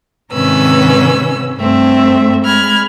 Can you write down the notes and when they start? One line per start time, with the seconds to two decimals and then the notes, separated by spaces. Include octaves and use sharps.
0.33 G#2 C3 D#3 C#4 B4 E6
1.59 G2 A3 C4 E5
2.44 G#3 B5 F6 G#6